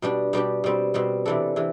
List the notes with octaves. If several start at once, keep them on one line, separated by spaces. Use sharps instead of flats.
B2 G3 D4 G4
B2 G3 D4 G4
B2 G3 C4
B2 G3 C4
C3 E3 G3 D4 A4
C3 E3